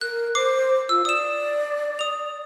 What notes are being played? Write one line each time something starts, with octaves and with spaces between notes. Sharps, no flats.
A#4 F#6
C5 D6 C7
F4 E6
D5 D#6 E7
D#6 F7